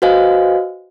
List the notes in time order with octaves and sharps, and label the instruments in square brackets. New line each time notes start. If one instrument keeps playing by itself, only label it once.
[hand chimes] F#4 B4 C5 D#5 F5 G#5